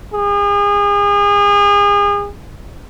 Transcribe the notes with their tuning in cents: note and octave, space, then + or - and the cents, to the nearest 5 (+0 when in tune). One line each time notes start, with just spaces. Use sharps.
G#4 -35